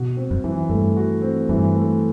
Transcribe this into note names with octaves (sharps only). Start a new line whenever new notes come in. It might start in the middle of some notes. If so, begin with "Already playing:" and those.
Already playing: B2 F#4
C4
F#2
E3
G2 A3
F#4
C4
G2 E3
A3